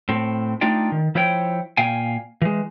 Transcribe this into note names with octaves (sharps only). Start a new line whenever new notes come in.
A2 C4
A3 D4 D#4 F4 D5 G5
D#3
F3 E4 C5 C#5 G5
A#2 F5 G5 G#5
E3 G#3